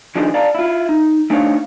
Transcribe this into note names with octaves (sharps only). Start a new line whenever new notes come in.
D#3 F3 D4 D#4 G#4 C5
D5 F5 A5 A#5
E4 F4
D#4
A3 D4 D#4 C5 C#5 F5